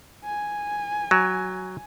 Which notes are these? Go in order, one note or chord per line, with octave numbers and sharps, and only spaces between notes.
G#5
F#3